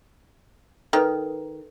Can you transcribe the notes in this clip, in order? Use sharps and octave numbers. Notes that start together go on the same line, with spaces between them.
D#3 A4 B4